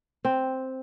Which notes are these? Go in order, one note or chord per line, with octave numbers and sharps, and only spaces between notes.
C4